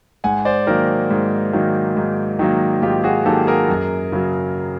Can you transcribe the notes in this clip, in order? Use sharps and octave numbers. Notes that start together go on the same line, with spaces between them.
G#2 F#5 G#5
C5 D5
D#3 F#3 A#3 A#4 C5
G#2
D#3 F#3 A#3
G#2
D#3 F#3 A#3
G#2 F4 G4
F#4 G#4
D#3 F#3 A#3 G4 A4
G#4 A#4
F#2
C#3 F#3